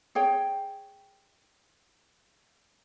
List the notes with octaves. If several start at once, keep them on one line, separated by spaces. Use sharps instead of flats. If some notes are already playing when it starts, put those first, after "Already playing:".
G#4 C#5 G5